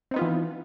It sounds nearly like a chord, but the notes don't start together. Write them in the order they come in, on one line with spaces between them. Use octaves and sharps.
C4 D#4 B3 F4 E3